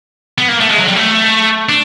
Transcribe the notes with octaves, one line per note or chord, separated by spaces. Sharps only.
B3
A#3
A3
G#3
F#3
G3
A3
D4